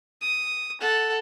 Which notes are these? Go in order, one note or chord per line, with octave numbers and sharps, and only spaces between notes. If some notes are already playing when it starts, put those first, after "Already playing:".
D#6
A4 F#5